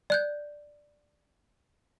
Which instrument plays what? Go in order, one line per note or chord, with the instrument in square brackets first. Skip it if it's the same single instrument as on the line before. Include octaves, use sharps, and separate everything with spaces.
[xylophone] D5 F#6 G6